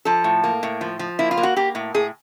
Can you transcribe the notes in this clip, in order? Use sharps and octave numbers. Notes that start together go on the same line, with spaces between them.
F3 A4
A2
A#3
A2
F3
F3
A#3 E4
F4
A#3
F#4
A#3 G4
A2
A2 G#4